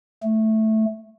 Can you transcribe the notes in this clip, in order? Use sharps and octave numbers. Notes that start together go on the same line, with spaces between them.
A3